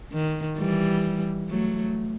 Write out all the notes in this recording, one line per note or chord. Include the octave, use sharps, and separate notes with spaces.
D#3
E3 G3
F#3 A3